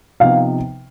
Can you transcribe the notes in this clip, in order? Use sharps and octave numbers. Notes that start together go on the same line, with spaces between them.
C3 F3 B3 D#4 F5